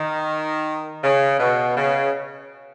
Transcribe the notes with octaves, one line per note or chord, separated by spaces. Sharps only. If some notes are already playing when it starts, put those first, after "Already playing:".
Already playing: D#3
C#3
B2
C#3